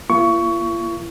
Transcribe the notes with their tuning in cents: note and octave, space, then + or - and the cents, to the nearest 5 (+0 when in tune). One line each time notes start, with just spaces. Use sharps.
A#3 +35 F4 -45 C#6 +15